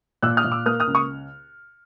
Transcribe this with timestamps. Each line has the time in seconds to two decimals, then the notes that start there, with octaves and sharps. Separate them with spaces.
0.23 A#2 E6 F#6
0.37 D#6 F6
0.44 A#2
0.52 D6 E6
0.66 A#3 D#6 F6
0.80 D#6 F6
0.87 C#2
0.95 C#6 D#6